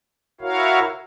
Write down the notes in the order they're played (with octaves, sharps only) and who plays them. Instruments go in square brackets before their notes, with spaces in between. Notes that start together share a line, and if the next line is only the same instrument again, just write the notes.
[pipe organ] E4 F#4 A#4 C#5 F5